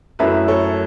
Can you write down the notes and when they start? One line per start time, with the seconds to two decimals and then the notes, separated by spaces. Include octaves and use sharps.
0.19 F#2 F#3 A3 E4 B4 E5
0.48 A4 C#5